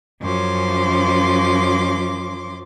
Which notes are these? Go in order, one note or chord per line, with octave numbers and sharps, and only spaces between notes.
F#2 F3 C#4 C6 D6